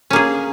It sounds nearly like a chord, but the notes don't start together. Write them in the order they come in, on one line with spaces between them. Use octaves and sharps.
C#4 A#3 G#4